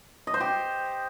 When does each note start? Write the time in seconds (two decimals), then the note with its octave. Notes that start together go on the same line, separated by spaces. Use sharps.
0.27 D#5
0.34 C5
0.41 G4